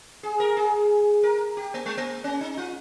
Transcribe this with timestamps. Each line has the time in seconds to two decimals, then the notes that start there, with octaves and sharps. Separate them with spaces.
0.23 G#4
0.40 A#4
0.57 G#4
1.23 A#4
1.57 G4
1.74 A#3
1.86 G#3
1.98 A#3
2.24 C#4
2.41 D#4
2.57 F4